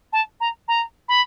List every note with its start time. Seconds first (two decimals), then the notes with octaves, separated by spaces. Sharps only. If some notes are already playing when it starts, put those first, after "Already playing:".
0.12 A5
0.40 A#5
0.68 A#5
1.08 B5